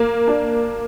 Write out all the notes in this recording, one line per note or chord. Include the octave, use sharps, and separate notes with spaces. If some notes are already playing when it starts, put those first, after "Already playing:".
Already playing: A#3
D4